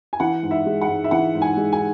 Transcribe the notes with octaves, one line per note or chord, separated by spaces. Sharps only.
G#5
E3 F#5
G#2
E5
G#3
F#5
G#2
E5
E3 F#5
G#2
G#5
G#3
G#5